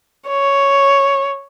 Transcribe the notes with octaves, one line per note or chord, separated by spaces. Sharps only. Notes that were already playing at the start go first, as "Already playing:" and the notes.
C#5